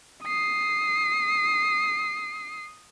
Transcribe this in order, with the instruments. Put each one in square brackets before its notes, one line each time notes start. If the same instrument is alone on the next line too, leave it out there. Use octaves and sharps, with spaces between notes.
[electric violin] D#6 C7